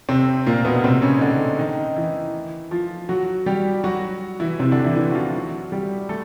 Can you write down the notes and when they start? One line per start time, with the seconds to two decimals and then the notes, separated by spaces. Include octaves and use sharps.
0.09 C3 C4
0.46 A#2 A#3
0.65 B2 B3
0.84 C3 C4
1.02 C#3 C#4
1.18 D#4
1.21 D3 D4
1.59 D#3 D#4
1.96 E3 E4
2.71 F3 F4
3.09 F#3 F#4
3.46 G3 G4
3.84 F#3 F#4
4.40 E3 E4
4.59 C3 C4
4.72 D3 D4
4.84 E3 E4
4.96 E3 E4
5.11 F#4
5.15 F3 F4
5.34 F#3 F#4
5.72 G3 G4
6.09 A3 A4